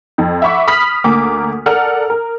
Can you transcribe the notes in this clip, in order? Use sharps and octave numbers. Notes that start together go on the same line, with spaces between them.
F2
E5 F#5 B5 C#6 D6
B5 D#6 F6 B6
D2 A#3 A#4 D6
A4 A#4 D5 F#5 F6
A#4